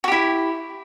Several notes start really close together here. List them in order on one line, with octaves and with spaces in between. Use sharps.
F#4 G4 E4